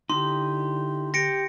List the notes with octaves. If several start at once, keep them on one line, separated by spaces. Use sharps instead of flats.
D3 D#4 E4 G4 C6
G4 A#6 C#7 D7